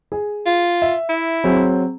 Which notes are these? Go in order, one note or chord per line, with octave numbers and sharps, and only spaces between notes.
G#4
F4
E5
E4
F#3 C4 G#4